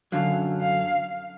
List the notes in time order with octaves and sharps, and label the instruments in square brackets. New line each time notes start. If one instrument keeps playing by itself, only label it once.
[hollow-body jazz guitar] F#2 D3 F#3 [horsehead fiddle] F5
[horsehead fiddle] F5